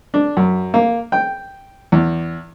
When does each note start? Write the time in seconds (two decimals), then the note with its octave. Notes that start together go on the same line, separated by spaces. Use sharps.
0.14 D4
0.37 F#2
0.74 A#3
1.12 G5
1.92 E2